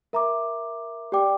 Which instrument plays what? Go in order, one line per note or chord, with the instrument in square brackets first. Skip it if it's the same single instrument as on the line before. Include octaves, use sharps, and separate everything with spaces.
[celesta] A#4 E5 A#5 D6
G4 D5 G5 D6